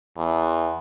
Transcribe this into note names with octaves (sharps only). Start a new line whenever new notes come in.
E2